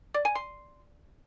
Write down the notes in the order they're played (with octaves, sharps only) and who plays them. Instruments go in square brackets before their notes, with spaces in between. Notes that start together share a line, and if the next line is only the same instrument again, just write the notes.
[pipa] D5
G#5
C6